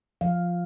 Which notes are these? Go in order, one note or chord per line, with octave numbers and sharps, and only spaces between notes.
F3 F5